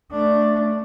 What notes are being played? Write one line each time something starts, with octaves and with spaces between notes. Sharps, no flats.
A3 D4